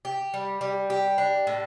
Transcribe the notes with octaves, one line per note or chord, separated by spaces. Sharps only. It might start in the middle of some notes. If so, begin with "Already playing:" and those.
G4
G3
G3
G4
D4
A2